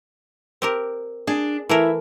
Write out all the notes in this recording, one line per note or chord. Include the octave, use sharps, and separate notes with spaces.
C4 G4 A#4
D4 G#4
E3 A3 E4 A#4 E5